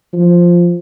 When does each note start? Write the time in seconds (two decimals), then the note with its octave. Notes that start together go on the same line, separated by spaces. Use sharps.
0.14 F3